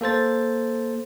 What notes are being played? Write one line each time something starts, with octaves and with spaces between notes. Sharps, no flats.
A#3 A4 C5 A6